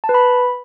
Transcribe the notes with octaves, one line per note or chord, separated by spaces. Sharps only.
A5
B4
B5